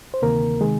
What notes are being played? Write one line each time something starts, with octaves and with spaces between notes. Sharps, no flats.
C5
D2 C3 D#3 A#3 A#4
C3 D#3 G#3 G#4